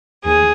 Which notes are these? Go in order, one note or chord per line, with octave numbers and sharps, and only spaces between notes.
D#2 G#4